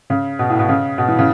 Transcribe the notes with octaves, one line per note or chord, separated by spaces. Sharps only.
C#3
B2
A2
B2
C#3
B2
E3
C#3